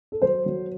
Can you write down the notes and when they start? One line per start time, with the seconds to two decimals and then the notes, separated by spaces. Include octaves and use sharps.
0.12 A4
0.22 F#3 C5
0.46 F#3